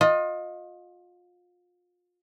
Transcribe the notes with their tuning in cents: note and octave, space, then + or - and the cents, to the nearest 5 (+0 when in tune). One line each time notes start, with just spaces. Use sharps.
F4 +30 D#5 +0